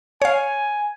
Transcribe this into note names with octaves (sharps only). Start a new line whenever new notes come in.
C#5 F5 G#5